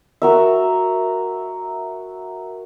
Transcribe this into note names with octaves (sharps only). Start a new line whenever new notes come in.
F#4 A#4 E5